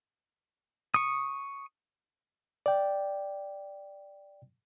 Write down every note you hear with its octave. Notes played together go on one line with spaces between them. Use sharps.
C#6 D#6
D5 G5